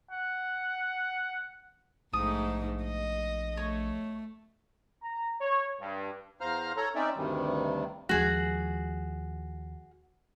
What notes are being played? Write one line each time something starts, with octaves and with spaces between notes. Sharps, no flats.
F#5
A#1 G#2 A3 D#4 D#6
D#5
A3 C#5
A#5
C#5
G2
E2 C5 F5 A#5 F6
A4 C#5 A#5
C4 C#4 D#4 D5 E5
D2 G2 C3 D#3 G3
D#2 F3 G#3 F#4 G#4